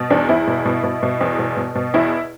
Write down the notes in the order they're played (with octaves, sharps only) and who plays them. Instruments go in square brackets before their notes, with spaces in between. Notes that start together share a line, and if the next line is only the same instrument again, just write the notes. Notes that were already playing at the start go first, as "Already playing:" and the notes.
Already playing: [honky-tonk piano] B2
E2 D4
E2 E4
B2
B2
B2
B2
E2
B2
B2
B2
E2 E4